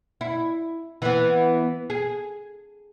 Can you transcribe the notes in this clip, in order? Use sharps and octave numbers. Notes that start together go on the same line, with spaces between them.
E4
E3 B3
G#4